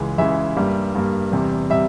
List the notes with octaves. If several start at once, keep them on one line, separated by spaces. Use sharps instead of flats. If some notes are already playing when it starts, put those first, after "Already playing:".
Already playing: C#2 C#3 E3 G#3
C#2 C#3 E3 G#3 E5
G2 G3 A#3
G2 G3 A#3
E2 C3 G3
C3 G3 E5